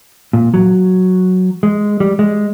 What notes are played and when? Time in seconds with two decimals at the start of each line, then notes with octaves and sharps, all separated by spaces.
0.33 A#2
0.54 F#3
1.63 G#3
2.00 G3
2.19 G#3